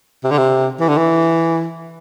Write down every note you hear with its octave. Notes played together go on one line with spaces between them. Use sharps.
C3
D3
C3
E3
D3
E3